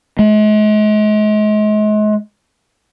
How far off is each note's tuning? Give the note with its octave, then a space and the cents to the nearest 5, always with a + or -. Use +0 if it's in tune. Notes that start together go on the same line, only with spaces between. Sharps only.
G#3 +40